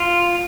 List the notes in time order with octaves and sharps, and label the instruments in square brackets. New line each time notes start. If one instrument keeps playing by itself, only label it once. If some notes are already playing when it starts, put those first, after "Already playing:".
Already playing: [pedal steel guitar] F4